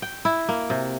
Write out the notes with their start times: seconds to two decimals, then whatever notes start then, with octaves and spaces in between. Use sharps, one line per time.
0.02 G5
0.25 E4
0.49 A#3
0.70 C3